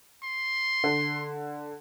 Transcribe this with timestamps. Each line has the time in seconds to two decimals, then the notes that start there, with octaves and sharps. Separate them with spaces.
0.23 C6
0.84 D3